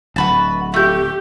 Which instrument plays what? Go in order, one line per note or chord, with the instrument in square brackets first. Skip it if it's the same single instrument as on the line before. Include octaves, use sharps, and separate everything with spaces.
[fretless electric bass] D1 [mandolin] F#4 B4 A5
[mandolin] A3 G6 [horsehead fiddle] G4